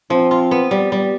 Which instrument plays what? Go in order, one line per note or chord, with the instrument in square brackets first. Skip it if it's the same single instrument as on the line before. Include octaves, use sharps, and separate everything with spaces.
[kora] F3 [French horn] C4
[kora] F4
B3
G3
G3